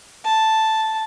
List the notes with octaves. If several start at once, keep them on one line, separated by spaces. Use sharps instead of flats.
A5